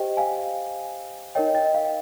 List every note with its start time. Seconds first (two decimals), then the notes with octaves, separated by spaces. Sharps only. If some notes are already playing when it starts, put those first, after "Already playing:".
Already playing: G4 C5 D#5 G5
0.17 F5 G#5
1.35 D#4 A#4 C#5 D#5 G5
1.55 D#5 G5
1.74 F5